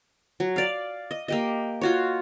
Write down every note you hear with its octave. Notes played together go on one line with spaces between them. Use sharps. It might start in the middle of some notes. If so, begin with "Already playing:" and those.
F#3
D5 F5
D#5
A#3 G4 D#5
F4 F#4 C#5